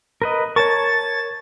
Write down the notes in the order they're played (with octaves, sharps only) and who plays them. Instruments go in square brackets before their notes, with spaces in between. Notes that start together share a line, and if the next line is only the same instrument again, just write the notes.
[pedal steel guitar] A#4 B4 D#5
[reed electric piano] A#4 [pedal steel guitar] C#5 A5 C#6 [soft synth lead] A6